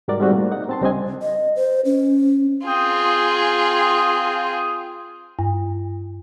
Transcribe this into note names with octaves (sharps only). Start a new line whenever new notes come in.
G#2 G3 F#4 A#4 D5
G3 G#3 C4 D#4 F#4
A2 A#3
D#4 F#5
C4 A5 C6
C#2 G3 C4 D4 D#5 G#5
D#5
C5
C#4
C4 F4 G#4 G5 D#6
G2